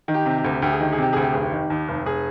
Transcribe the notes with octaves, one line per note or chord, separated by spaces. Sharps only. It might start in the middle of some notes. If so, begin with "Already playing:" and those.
D#3
G4
C3
G4
D2
D2 G4
G#4
D#3 G4
G#4
C3 G4
D2 G#4
G4
F1 G#4
G4
D#3
D#2
F1
F1 G#4